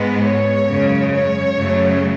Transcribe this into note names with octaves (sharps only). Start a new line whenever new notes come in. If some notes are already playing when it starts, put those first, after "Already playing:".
Already playing: G#2 G#3 B3
C#5
F#2 C#3 G#3
C#5
F#2 C#3 F#3 A3